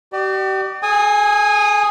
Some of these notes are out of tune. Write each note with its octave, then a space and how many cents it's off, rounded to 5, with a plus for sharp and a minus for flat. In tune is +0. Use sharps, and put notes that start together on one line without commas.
G4 -35 D5 +35
G#4 +40 G#5 -15 D#6 +0